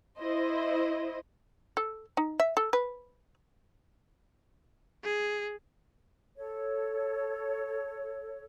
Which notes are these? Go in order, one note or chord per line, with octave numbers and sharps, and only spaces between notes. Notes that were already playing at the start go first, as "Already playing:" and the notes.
E4 C5 D#5
A4
D#4
E5
A4
B4
G#4
A4 C#5